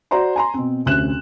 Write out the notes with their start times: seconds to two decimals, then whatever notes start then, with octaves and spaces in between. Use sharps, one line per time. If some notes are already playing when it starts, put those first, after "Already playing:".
0.11 F#4 C5 D5 A#5 C6
0.36 G#5 A#5 C6
0.54 B2 C4
0.86 F1 D2 C#4 F#6 E7